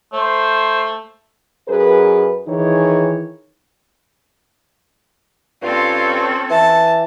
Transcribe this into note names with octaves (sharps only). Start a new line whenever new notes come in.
A3 C5
F#2 G#4 A#4 B4
D#3 E3 D#4 G#4 C#5
G2 C4 C#4 F4 A4
E3 A5